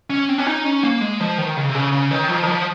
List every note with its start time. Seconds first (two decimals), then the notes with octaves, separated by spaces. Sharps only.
0.10 C#4
0.29 C4
0.38 C#4
0.47 D#4
0.65 C#4
0.83 A#3
1.01 G#3
1.20 F3
1.38 D#3
1.56 C#3
1.69 C3
1.74 C#3
1.92 C#3
2.11 D#3
2.29 F3
2.43 D#3
2.47 F3